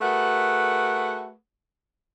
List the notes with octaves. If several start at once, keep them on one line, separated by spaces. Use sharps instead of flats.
A3 F#4 G#4 A#4 B4 F#5